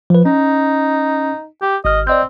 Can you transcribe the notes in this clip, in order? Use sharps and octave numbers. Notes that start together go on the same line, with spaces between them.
F3 B4
C#4 D#4
G4
G#1 D#5 F6
C4 D5 D#5 G6